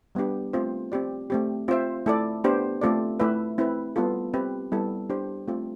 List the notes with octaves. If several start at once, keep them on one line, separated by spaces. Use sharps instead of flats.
G3 B3 D4 G4
A3 C4 F4 C5
C4 G4 D5
A3 C4 G4
C4 F4 C5 E5
A3 E4 A4 D5
B3 D4 G4 C5
A3 C4 F4 A4 D5
A3 E4 B4 E5
C4 E4 B4
G3 B3 F4 A4
C4 G4 B4
G3 B3 E4 A4
D4 G4 C5
A3 C4 F4